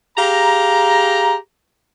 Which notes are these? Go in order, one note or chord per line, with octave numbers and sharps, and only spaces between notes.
G4 G#4 F5 A#5